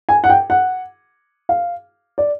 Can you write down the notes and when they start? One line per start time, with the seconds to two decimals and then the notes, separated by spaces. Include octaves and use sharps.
0.09 G#5
0.24 F#5
0.30 G5
0.50 F#5
1.49 F5
2.18 D5